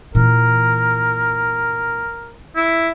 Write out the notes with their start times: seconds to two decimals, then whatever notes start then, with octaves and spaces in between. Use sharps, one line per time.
0.15 A#2 E3 A#4
2.56 E4